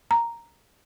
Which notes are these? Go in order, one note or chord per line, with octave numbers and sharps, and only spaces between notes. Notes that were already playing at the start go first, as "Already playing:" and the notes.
A#5